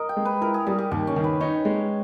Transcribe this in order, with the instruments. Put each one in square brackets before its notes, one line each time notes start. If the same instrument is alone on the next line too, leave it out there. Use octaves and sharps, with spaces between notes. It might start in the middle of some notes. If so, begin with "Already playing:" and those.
Already playing: [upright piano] A#4 [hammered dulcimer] D#5
[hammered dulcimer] G5
[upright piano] G#3
[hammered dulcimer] B4
[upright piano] E4 [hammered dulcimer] A#4
[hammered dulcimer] G#4
[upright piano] G3 [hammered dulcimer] G#4
[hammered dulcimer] G4
[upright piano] D#2 [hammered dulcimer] G4
[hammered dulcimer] C#4
[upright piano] D#3
[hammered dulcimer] B4
[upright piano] D#4 [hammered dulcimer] C#5
[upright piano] G#3